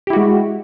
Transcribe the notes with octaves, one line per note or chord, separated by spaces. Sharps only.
G#3 E4 F#4 G4